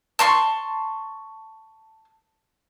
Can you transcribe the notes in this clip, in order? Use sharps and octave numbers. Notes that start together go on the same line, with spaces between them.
A5 C6 C#6